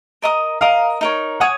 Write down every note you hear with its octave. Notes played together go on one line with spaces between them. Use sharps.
A#4 D#5 A#5 D#6
A#4 D#5 F5 A#5 D#6
D#4 A#4 C#5
C#5 F#5 G#5 D#6